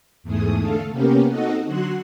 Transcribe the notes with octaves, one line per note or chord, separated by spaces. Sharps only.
E2 G#2 A3 G#4 D#6
D3 A3 A4 F5
C3 A#3 B3 C#4 G4 A#4
C4 D#4 F#4 A4 D#5 F#5
D3 F#3 F#4 C6 F#6